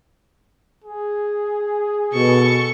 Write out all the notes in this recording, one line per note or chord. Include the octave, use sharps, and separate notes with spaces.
G#4
B2 A4 C#6